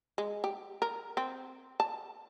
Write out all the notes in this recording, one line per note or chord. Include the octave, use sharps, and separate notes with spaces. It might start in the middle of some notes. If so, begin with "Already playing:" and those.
G#3
G4
A#4
C4
A5